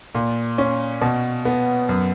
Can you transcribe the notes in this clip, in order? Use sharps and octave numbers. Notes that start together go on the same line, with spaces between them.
A#2
C#4
B2
B3
F#2